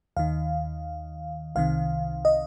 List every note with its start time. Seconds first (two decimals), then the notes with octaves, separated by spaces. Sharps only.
0.17 D#2 D#3 F5
1.55 C2 C3 D#3 F5
2.25 D#5